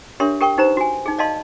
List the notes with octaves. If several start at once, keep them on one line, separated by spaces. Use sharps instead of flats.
D4 G4 A#4 C#5 E5 C6
G4 A#4 G5 C#6
D#4 G4 B4 C5 A#5
F#4 G#5
D#4 G#4
D5 D#5 F5 A5 C6